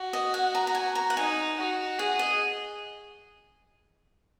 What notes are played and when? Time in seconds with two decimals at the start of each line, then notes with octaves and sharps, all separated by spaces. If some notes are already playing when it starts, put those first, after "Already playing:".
Already playing: F#4
0.13 D#5
0.34 F#5
0.55 A#5
0.67 A#5
0.75 G#5
0.95 A#5
1.10 F#5
1.17 D#4 G#5
1.58 F#4
1.99 G#4 F#5
2.19 D#5